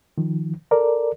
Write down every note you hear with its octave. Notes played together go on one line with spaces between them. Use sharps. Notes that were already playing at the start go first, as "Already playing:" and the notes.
D#3 F3
A4 A#4 D5